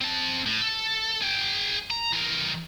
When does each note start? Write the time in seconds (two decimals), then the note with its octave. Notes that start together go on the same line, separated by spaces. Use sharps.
0.01 C4 A5
0.46 A2
0.62 A4
1.22 G#4 G5
1.91 A#5
2.13 E3 A#4